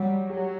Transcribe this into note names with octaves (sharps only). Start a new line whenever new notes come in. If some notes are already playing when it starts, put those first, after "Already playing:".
Already playing: F#3 G3
F#3 G4